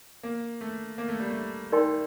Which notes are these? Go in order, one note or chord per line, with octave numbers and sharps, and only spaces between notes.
A#3
A3
A#3
A3
G3
A3
D#4 A#4 D5 G5 C6